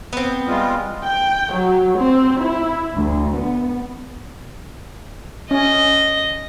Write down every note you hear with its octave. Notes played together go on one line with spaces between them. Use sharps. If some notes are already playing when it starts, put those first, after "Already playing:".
B3 C4
G3 G#3 F4
G5
F#3
C4
E4
D2
B3
C#4 D#5